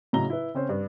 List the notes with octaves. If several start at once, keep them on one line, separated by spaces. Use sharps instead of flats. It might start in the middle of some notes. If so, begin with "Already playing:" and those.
A2 C#3 F#3 D#5 A#5 G7
E4 B4
C#3 C4 C#4 C5
G2